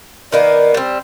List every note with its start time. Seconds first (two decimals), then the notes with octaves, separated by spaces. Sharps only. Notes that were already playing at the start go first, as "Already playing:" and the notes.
0.32 D#3 A#3 B3 D5
0.74 G3 C4